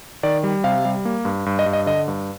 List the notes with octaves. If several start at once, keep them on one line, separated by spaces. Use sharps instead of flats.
D#3 D5
G3
C3 F5
G3
A#3
G2
G2
D#5
G2
D#5
D3 D#5
G2